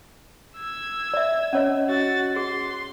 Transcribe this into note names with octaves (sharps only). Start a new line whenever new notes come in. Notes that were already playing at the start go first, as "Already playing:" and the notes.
E6 G#6
D5 E5
C#4 C#5 D#5
F#4 A6
G#4 C6